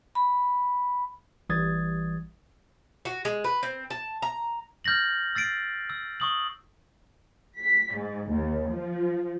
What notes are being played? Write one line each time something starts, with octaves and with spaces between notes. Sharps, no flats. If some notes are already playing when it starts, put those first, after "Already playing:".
B5
A1 E3 G3 D#6 G#6 A6
F#4
G#3
B4
C4
A5
A#5
F6 G6 A6 A#6 F#7
E6 A6 C7 D7
E6
C#6 D#6 F#7
B6
G#2
D#2
F3